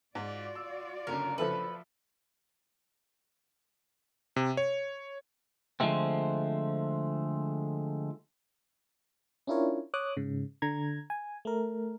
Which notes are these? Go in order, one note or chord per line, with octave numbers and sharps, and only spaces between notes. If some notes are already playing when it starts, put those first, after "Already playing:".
G#2 F4 F#4 D5
E6
F#1 D3 C#4 A#4
F3 A4 B4 E5
C3
C#5
D3 F3 G#3 A3 C4
C#4 D4 E4 F4 A#4 C#5
C#5 D6 D#6 F#6
G#2 C#3
D3 A#5 G#6
G#5
A3 A#4